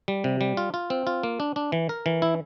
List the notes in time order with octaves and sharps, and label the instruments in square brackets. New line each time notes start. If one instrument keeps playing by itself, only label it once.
[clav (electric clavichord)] G3
C3
G3
F4
F4
C4
F4
A#3
D4
D4
E3
A#4
E3
E4